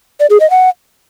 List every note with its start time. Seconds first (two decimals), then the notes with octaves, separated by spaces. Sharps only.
0.20 D5
0.30 G#4
0.40 D#5
0.50 F#5